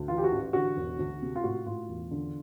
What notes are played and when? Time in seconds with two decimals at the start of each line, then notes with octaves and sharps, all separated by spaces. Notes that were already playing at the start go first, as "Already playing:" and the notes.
Already playing: D2
0.08 E3 F4
0.18 G4
0.24 F#4
0.32 A1
0.53 D3 F#4
0.77 E1
0.98 D2
1.22 C3
1.36 F4
1.44 A2 F#4
1.66 A2 F4
1.89 E1
2.11 D3